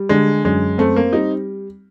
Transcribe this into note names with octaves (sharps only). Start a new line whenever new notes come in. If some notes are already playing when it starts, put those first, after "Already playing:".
Already playing: G3
D3 G#3
F#2 G#3
A3 C4
A#3
G3 D#4